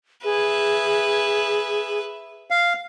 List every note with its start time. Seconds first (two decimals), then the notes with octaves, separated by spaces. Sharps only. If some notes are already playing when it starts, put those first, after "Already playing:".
0.24 G#4 B4 E5
2.50 F5